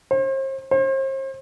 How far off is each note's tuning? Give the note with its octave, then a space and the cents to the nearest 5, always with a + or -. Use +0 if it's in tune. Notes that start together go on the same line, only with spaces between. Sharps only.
C5 +40
C5 +40